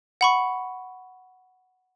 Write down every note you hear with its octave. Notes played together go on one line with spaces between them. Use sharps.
F#5 B5 C#6